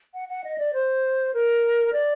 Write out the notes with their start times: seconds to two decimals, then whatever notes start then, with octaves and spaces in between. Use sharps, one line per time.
0.14 F#5
0.29 F#5
0.44 D#5
0.58 D5
0.73 C5
1.34 A#4
1.93 D5